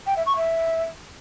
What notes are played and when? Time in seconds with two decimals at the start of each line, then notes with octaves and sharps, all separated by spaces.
0.07 G5
0.17 E5
0.26 C#6
0.36 E5